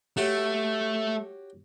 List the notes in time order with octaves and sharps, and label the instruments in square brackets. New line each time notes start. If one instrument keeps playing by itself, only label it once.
[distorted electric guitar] A3 [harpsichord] F#4 G4 C#5